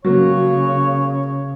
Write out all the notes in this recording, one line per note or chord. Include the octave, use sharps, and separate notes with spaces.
C#3 F#3 A#3 C#5